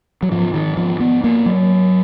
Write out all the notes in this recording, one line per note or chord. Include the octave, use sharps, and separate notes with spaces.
F#3
G#2 F3
D#3
F3
B3
A#3
F#3